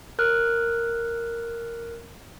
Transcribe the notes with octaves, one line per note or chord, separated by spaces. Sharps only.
A#4 F6 F#6